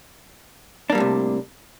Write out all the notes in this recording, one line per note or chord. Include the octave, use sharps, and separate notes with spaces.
A2 C3 G3 A#3 D4